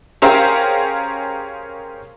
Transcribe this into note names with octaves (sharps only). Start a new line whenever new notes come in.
C#4 G4 G#4 A#4 C5 F5